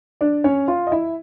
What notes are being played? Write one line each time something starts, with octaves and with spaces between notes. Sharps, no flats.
D4 D5
C#4 C#5
F4 F5
D#5
E4 E5